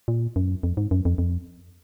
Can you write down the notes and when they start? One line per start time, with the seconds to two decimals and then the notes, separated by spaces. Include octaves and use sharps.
0.08 A#2
0.36 F#2
0.63 F2
0.77 G#2
0.91 F#2
1.05 F2
1.18 F2